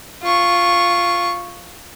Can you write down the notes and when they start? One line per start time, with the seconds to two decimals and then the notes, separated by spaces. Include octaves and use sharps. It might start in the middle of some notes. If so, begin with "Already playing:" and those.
0.23 F4 C#6